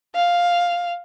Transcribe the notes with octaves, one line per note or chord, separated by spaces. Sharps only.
F5